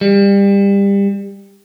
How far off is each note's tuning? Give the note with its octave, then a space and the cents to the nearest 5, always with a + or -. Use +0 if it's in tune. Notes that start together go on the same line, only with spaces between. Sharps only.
G3 +25